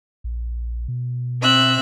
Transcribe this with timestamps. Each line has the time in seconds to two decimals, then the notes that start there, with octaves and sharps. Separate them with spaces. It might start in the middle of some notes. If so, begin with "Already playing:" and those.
0.24 A#1
0.88 B2
1.39 C4 E5 F#6